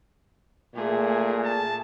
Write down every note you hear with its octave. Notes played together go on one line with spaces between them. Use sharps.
A#2 A3 G#4
A5